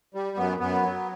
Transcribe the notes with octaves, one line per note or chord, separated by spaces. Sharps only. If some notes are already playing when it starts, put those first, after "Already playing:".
G3
F#2 B3
F#2 B3
F#3